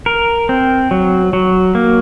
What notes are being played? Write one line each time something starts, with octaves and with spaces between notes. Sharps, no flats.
A#4
C4
F#3
F#3
A#3